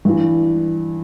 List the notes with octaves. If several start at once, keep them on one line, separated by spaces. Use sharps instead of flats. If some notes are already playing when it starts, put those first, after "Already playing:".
G2 E3